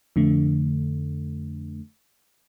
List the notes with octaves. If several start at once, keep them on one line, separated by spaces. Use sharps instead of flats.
F2 D3 A3